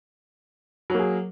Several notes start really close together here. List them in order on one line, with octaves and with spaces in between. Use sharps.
F#3 A#3 G#4